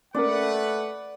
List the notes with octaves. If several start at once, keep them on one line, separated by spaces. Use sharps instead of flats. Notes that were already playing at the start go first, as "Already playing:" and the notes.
A3 A#3 C#4 A#4 B4 D5 F#5